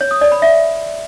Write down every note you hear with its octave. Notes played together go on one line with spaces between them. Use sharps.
C#5
D#6
D5
B5
E5